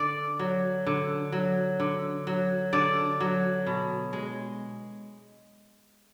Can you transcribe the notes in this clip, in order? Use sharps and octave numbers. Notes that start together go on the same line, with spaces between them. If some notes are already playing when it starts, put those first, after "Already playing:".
Already playing: D3 D5
F#3
D3
F#3
D3
F#3
D3 D5
F#3
B2
G#3